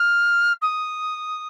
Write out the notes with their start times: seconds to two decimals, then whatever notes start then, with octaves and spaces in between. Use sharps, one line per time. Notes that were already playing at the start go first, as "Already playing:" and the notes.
Already playing: F6
0.61 D#6